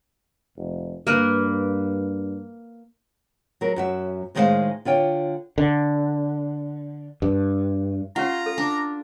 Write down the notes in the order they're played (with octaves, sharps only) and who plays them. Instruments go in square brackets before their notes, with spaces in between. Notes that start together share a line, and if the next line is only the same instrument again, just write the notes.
[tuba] F1
[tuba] G2 [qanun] A#3 A#4 B4
[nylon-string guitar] F#3 A#4
F#2 F#4 E5
A2 D#3 G#3 G4 C5 F5
D3 F4 C#5 G5
[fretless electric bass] D3
G2
[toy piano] C#4 G4 F#5 [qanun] F4 [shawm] A#5
[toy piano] A4
[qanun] D4